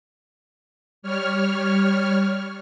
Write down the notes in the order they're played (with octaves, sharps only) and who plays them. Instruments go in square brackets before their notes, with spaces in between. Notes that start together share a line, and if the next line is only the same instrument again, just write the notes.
[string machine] G3 C#5 F6